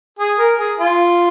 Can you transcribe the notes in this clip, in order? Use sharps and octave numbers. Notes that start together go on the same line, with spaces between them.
G#4
A#4
G#4
F4